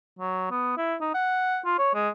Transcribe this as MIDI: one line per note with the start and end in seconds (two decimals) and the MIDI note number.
0.19 0.47 54
0.51 0.73 59
0.77 0.95 64
1.01 1.10 63
1.14 1.59 78
1.65 1.76 65
1.78 1.92 73
1.94 2.09 56